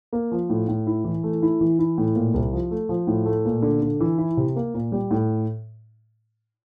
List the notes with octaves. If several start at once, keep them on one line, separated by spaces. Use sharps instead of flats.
A#3
F3
A2
A2
E4
E3
A3
E4
E3
E4
A2
A#2
C2
F3
A3
F3
A2
A3
A#2
D3
D3
E3
E4
C3
A#3
A#2
G3
A2